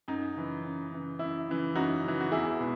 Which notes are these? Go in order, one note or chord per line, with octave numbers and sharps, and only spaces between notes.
F#2 D#4
C#3 E3
F#2
C#3 E3
F#2 E4
C#3 E3
F#2 D#4 F#4
C#3 E3
F#4
E2 E4 G#4
B2 G#3 B3